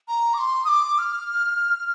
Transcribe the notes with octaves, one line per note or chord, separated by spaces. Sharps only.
A#5
D6
C6
D#6
D6
F6